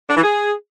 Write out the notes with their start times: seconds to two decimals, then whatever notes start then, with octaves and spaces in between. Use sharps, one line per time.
0.09 D4
0.16 E3
0.23 G#4